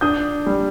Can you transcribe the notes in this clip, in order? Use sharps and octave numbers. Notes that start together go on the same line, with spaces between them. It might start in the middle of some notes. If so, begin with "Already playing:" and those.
D4 D#6 G6
G3